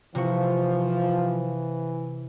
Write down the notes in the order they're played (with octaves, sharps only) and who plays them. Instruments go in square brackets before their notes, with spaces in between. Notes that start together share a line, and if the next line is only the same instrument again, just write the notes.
[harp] C3 C#6 [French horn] E3 [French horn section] F3